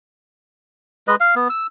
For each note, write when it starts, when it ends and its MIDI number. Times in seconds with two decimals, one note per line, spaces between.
1.08 1.16 56
1.08 1.16 71
1.08 1.16 75
1.20 1.35 77
1.35 1.48 59
1.50 1.67 88